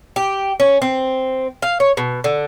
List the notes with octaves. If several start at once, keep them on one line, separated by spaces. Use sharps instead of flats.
G4
C#4
C4
F5
C#5
B2
D3